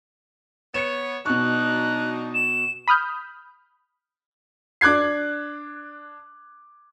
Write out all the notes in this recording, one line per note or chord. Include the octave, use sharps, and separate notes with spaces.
B3 C#5 C#7 E7
B2 F#3 D4 D#4 C#6 F#6
E7
B5 D#6 F6 G6
D4 D6 F#6 G#6 C7